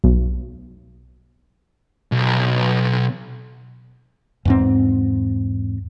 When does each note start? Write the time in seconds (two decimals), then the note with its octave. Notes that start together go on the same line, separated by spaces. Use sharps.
0.04 B1
2.12 B1
4.45 E2 G#2 C4